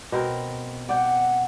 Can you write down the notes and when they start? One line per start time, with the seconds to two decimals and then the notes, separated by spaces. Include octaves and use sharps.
0.12 B2 C4 A#4
0.89 D5 F#5 G5